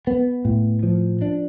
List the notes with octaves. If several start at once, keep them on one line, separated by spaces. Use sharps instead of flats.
B3
A2
F3
D4